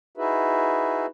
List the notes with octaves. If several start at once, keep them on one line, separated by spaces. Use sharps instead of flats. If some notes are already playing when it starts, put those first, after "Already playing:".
D#4 E4 F#4 G#4 B4 E5